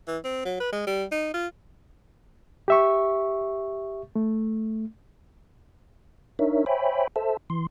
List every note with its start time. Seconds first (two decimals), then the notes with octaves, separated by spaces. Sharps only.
0.07 E3
0.24 C4
0.45 F#3
0.60 B4
0.72 G#3
0.87 G3
1.12 D#4
1.34 F4
2.68 G4 E5 C#6
4.16 A3
6.39 D4 D#4 A#4 C#5 E5
6.66 C5 C#5 E5 G5 G#5 B5
7.16 A4 C5 E5 A5
7.50 E3 C6